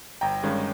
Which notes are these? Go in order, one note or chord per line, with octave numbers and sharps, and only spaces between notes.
G1 G5 A#5
G2 D#3 G#3 C#4